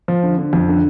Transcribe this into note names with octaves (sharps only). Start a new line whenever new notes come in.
F3
D3
D3
F2
D3